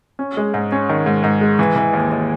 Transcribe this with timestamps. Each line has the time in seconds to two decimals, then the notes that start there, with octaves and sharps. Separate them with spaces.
0.19 C#4
0.37 G#3
0.54 G#2
0.72 C#4
0.89 D#3
1.06 G#2
1.24 G#2
1.41 G#3
1.59 E3
1.76 E3
1.93 D#2
2.11 D#2